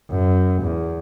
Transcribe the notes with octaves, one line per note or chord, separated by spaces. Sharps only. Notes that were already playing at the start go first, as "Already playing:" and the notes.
F#2
E2